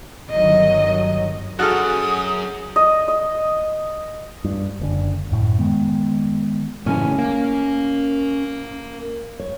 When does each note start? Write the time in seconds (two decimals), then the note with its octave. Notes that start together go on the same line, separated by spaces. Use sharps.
0.30 G1 D#3 F#3 D#5
1.59 F#2 F#4 G#4 A4 D#6 F6
2.76 D#5
3.08 D#5
4.45 G2
4.80 F#1 D3
5.32 F#2 A2
5.59 D#3 G#3 B3
6.86 A2 C#3 E3 C#4 G#5
7.18 A#3
9.40 C#5